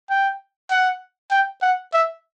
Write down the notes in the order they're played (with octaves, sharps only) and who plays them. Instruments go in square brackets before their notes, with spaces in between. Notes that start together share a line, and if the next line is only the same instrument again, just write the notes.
[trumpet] G5
F#5
G5
F#5
E5